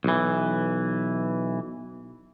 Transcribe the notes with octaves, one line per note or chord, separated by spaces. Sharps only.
B1 E3